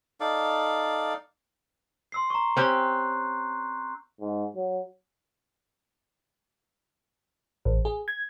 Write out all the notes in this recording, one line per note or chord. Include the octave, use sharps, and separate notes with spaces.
D#4 A4 D5 F5
C6 E6 C7
A#5 C#6
C4 C#4 G4 C6 F#6 G6
G#2
F#3
A1
G#4
G#6